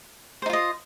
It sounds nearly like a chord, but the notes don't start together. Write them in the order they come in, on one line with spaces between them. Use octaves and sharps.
C5 D#4 F4 D#5